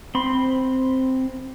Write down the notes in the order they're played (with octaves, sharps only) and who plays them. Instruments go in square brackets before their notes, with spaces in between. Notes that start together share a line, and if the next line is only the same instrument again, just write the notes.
[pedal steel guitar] C4 B5 C6